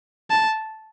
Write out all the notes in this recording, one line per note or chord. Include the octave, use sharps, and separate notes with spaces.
A5